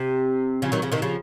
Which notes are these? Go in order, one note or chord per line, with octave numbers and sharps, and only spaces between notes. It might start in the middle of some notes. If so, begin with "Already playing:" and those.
Already playing: C3
C#3 F3
D#3 F#3
C#3 F3
C3 D#3
C#3 F3